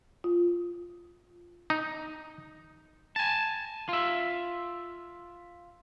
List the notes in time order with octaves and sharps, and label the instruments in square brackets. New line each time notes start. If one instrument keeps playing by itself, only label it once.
[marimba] F4
[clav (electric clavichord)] D#4
[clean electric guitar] G#5 A5
F4 E5